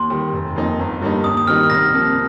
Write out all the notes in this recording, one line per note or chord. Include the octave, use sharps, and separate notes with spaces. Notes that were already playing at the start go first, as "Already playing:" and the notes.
Already playing: D#2 C6
D#3 G3
F1
F2 F3 A#3 D#4
G1
G2 G3 A#3 D#4
D#2 D#6
D#6
D#3 G3 A#3 D#4 F6
C2 F6 A#6
C3 F3 A#3